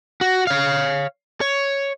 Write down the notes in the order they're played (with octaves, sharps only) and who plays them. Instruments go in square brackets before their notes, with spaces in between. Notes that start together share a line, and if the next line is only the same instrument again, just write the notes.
[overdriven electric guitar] F#4
C#5 F5
C#5